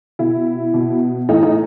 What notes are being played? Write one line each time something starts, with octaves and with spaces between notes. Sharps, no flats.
B2 E4
B2
A2 E3 D#4
D#4